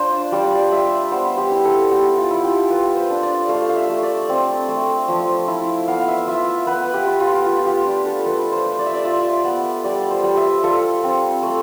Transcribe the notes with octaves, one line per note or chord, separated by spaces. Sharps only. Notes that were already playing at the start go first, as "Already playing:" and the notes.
Already playing: D4 F4 C5 D5
G3 D5
G3 E5
B3 C5
G4
E4
A4
B3 G4
F4
E4
G4
F4 B4
C5
D4
D5
A3 F5
F5
E5
A3
D5
C4
A3
F3
E4
B3 F5
E5
F4 E5
B3 B4
G4
F4
F4
F4
G4
D4
A4
A3 B4
C5
A3
D5
E5
D5
F4 E5
B3
G3 D5
C5
G3
E5
F4 A4
C4
A3